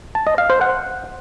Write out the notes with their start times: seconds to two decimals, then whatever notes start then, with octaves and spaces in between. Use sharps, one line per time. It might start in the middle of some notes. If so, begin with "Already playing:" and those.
0.15 A5
0.27 D#5
0.38 F5
0.50 C5
0.61 F#5